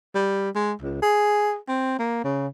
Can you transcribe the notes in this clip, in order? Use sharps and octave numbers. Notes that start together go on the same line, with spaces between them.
G3
G#3
C#2
G#4
C4
A#3
C#3